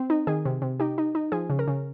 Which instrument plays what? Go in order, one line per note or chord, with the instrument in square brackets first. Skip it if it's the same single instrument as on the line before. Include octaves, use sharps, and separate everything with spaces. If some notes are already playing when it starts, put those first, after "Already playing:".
Already playing: [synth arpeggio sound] C4
D#4
D#3 G#4
C3
C3
D#4 G4
D#4
D#4
F3 G#4
C#3
A#4
C#3